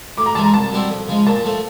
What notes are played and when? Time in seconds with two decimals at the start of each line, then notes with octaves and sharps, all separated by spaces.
0.17 A2 D6
0.26 A#5
0.35 E3 G#3 A5
0.44 A#5
0.54 C2 A5
0.72 B2 G3 C4 E4
0.90 F2
1.08 C#3 F3 G#3
1.26 A#2 A5
1.44 F3 A3